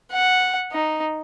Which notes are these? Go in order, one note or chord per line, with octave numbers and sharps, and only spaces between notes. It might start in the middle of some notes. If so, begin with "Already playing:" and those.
F#5
D#4